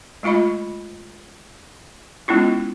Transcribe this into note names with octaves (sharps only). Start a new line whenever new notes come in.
G#3 A3 F4 D#5 B5
G#3 B3 C#4 E4 F4